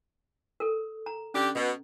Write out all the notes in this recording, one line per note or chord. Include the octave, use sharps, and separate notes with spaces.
A4 A#4
A#5
D3 C#4 D4 G4
B2